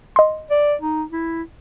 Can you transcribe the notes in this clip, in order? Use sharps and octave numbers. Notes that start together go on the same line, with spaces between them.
D#5 C6
D5
D#4
E4